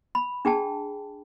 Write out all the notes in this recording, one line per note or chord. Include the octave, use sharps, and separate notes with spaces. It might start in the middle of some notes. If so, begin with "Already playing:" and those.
B5
D4 G#4 G5 A5